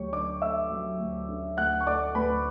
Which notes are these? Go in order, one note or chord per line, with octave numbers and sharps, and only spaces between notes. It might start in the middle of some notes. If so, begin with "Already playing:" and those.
Already playing: D2 F#3 G4 C#5 C#6
D3 D5 D6
A3 E5 E6
F#3
D2
D3
D2 F#5 F#6
C#6
A3 D5 D6
D2 B4 B5